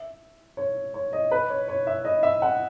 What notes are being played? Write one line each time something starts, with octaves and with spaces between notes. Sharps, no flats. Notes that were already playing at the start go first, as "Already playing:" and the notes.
Already playing: E5
C#5
C#5
D#5
B4
C#5
C#5
E5
D#5
E5
F#5